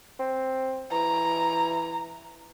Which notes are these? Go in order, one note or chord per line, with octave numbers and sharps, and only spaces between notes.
C4
E3 A#5